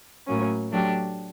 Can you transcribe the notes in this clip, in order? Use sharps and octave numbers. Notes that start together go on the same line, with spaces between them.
A2 F#3 A#3 C#4
F#3 A3 D4 G4